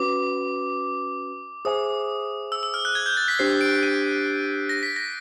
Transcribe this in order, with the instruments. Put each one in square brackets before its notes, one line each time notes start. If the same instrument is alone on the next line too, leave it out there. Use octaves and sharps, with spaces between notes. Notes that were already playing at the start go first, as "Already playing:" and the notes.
Already playing: [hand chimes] C#4 F#4 B4 [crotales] D6
[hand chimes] G#4 C5 E5 G#5 [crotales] D#6
[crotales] E6
E6
F6
F#6
G#6
G6
A6
B6
[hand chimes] D4 G4 C5 [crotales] C7
[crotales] D7
D#7
A#6
B6
A#6